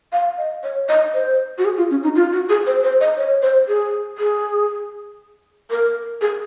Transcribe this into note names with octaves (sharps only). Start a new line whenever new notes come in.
F5
D#5
C#5
D#5
C5
F#4
G#4
F4
C#4
D#4
F4
F#4
G#4
C5
C5
D#5
C#5
C5
G#4
G#4
A#4
G#4